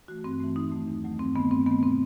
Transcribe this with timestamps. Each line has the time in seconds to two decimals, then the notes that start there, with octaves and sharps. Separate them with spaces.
0.08 E3 A3 F#4
0.24 G2 C4
0.40 E3 A3
0.56 E2 D#4
0.72 D#3 F#3 A3
0.88 E2
1.04 D#3 F#3 A3
1.19 G2 C4
1.36 D#3 A3 B3
1.51 G2 C4
1.67 D#3 A3 B3
1.83 B2 C4